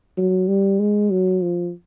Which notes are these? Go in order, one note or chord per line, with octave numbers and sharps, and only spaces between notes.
F#3
G3
G#3
F#3
F3